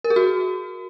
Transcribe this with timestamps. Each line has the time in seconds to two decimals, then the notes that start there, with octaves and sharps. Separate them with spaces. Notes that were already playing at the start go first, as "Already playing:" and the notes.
0.04 A#4
0.10 G#4
0.16 F#4